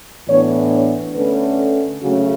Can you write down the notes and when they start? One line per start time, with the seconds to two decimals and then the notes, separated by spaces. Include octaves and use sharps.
0.27 A2 E3 B3 D4 C#5
0.71 C#5
1.14 D3 A3 C#4 B4
2.02 C#3 F#3 A3 C#4 F#4